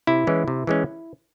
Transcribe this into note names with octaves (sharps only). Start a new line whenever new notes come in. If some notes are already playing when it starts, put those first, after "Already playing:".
C3 E4
E3 G#3 C#4
C3
E3 G#3 C#4